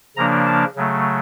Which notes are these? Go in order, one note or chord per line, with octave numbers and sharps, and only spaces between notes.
C#3 F3 A#3 D4 A#5
A5
C#3 F#3 A3